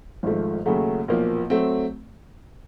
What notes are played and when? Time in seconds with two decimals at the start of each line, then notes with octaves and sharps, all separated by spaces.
0.23 G#1 G#2 F3 A3
0.66 D#2 C#3 F#3 A3
1.08 B1 A#2 F3 A#3
1.50 F#3 A3 C4